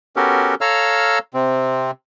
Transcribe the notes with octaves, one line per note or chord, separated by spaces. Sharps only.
B3 C#4 F#4 G4 A4 A#4
A4 C#5 F5 A#5 E6 F6
C3 C4